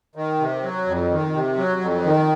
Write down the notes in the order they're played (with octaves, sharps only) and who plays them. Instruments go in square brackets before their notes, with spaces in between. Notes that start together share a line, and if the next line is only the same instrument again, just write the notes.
[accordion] D#3
C3
F#3
F2
D#3
C3
F#3
F2
D#3